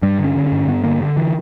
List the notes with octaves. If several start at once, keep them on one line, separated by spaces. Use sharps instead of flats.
G2 G3
D3
C#4
D3
C#4
G2
G2 B3
D3 A#3
D3
E3